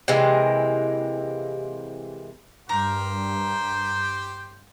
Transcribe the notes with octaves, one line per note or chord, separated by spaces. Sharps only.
C3 E3 G#3 A#3
G2 G4 A#4 C5 G5